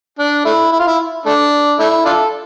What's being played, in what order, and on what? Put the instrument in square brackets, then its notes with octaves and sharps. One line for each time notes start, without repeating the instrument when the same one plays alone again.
[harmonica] D4
A3 E4
E4
F4
E4
A3 D4
A3 E4
D4 F4 A4